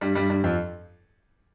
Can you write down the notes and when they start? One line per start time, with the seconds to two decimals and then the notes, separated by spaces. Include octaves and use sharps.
0.01 G2 G3
0.15 G2 G3
0.30 G2 G3
0.44 F2 F3